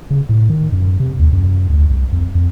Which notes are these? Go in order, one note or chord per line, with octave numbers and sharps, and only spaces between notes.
C#3
A2
D#3
F#2
C3
D#2
F#2
D2
C2
F2
F2